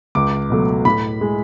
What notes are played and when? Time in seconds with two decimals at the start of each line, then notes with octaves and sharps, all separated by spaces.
0.15 C#2 D6
0.50 B2 F#3 A3
0.85 A2 B5
1.21 G#3